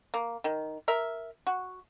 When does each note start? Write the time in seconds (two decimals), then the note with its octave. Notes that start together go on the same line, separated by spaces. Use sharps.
0.14 A#3
0.44 D#3
0.88 A#4 E5
1.47 F#4